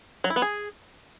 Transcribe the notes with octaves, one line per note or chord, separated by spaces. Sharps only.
F#3
E4
B3
G#4